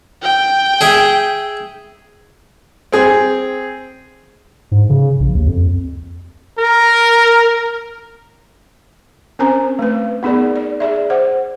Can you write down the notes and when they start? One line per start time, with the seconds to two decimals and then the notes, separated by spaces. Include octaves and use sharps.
0.22 G5
0.81 G#4 E5
2.92 C4 G#4
4.71 G#2
4.90 C#3
5.20 A#1
5.34 D#2
5.46 F2
6.59 A#4
9.39 C4 C#4 A#4 C5 G#5 A#5
9.79 A3 B4
10.23 B3 D#4 G#4 A#4 D5
10.56 D5
10.80 G#4 D5 E5
11.10 C5 F#5